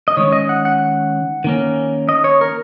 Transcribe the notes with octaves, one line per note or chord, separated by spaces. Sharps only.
D#5
D#3 G#3 C#4 C#5
D#5
F#5
F#5
D#3 A#3 C#4
D#5
C#5
A#4